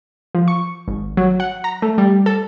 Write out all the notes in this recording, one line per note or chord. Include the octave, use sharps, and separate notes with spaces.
F3
C#6
G#1
F#3
F#5
A#5
A3
G3
A4